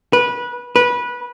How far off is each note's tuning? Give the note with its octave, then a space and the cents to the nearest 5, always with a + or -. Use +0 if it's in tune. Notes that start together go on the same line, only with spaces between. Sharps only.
B4 -20
B4 -20